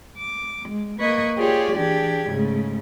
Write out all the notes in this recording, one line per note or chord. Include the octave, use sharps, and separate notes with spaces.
D6
G#3
A#3 B4 D#5 C#6 D#6 G#6
F4 G4 G#4 C#5 D5
E3 D4 G4 G#4 G#6
G#2 C#3 A3